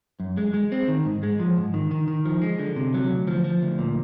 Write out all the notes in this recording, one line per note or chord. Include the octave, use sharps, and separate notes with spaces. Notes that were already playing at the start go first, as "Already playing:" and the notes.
F#2
G#3
G#3
C4
D#3
G#2
G#3
F3
G#2
D#3
D#3
D#3
F3
G#3
D3
C3
F#3
D2
F3
F3
D2
A#2